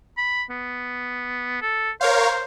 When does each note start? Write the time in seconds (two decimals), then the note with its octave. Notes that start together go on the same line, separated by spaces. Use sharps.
0.18 B5
0.50 B3
1.62 A4
2.01 A#4 C5 C#5 F5